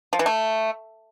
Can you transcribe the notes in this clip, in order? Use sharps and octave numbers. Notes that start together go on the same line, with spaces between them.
F3
E3
A3